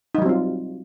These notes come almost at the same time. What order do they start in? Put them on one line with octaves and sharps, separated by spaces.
D#4 G3 F#3 C4 F4